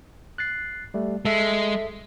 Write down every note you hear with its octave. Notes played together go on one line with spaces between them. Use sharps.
F#6 A6 C7
G3 A3
G#3 A4 E5 B6